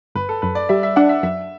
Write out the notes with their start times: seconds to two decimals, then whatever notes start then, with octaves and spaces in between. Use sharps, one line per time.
0.15 G1 B4
0.29 A4
0.42 F#2 B4
0.55 D5
0.69 G3 E5
0.83 E5
0.96 D4 F#5
1.09 E5
1.23 F#2 E5